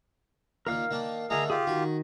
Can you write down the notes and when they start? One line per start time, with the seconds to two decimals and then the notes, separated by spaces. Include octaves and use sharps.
0.67 A#2 D#3 A#4 F5 F6
0.91 D#3 A#3 D4
1.30 D3 D#3 A3 G#4 A#5
1.50 F4 G4 G#4
1.67 D#3 F#4